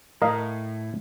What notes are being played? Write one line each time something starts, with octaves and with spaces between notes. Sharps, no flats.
A2 A#4 D#5 F5